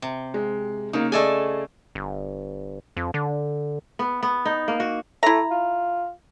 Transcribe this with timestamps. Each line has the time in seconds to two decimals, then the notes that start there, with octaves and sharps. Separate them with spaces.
0.02 C3
0.34 G#3
0.93 C#3 A#3 D#4
1.12 A3 G#4 A4 D5 D#5 G#5
1.95 G1
2.97 F2
3.14 D3
3.99 B3
4.23 B3
4.46 D#4
4.68 A#3
4.80 F#4
5.23 A3 E4 A#5
5.51 F4